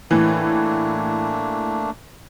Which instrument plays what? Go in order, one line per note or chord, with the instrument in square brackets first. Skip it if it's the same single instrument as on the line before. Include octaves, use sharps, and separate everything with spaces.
[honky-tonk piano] A2 E3 [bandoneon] A3 A#3 D4